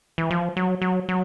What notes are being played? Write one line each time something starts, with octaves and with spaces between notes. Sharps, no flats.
E3
F3
F#3
F#3
F#3